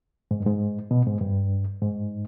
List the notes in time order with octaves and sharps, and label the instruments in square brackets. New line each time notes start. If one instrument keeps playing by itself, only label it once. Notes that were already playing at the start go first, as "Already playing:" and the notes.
[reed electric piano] G#2
G2
G#2
B2
G#2
G2
G#2